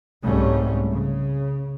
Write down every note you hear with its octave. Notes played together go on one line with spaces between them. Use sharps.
C2 G#2 G3 A3 C#4
C#3